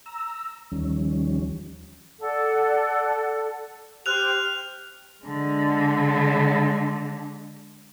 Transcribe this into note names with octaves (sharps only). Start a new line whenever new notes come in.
A#5 E6
D#2 D#3 F3 G3 C#4
A4 D5 F#5
G4 C5 F6 F#6 F7
D3 G#3